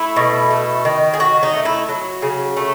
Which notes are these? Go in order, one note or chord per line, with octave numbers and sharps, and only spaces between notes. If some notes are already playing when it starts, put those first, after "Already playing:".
Already playing: A3 E4
B2
A3
D#3
G#4
D#3 F#4
D#4
A3
E4
F#3
C#3
A3